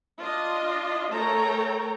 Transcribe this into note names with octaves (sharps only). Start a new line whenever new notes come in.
D4 F4 D#5
A3 A4 A#4 C#5 G5 A#5